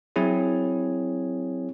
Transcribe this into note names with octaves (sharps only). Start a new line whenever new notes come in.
F#3 C4 E4 G#4 C#5